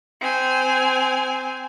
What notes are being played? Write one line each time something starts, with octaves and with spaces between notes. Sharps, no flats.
C4 G#5